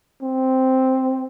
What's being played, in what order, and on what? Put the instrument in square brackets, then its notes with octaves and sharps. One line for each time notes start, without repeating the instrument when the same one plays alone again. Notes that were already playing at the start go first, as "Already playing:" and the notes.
[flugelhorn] C4